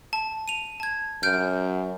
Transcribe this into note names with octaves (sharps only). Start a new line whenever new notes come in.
A5
D#7 F7
A5 G#6
F#2 F6 G6 D7